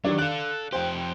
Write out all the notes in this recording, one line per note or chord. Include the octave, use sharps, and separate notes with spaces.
D#3 F#3 G3 D4
A4 D5 F5 F#6
F2 G4 C5 G5